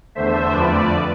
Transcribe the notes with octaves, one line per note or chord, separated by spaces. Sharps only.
E2 D3 A3 C5 E5
F2 D3 F3 A3 B4 D5